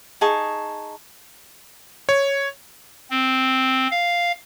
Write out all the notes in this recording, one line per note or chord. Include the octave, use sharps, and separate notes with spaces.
D#4 G#4 A5 C#6
C#5
C4
F5